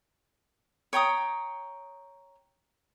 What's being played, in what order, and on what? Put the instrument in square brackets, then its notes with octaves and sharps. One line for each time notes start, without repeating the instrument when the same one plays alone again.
[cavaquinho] C#5 G5 A#5 D#6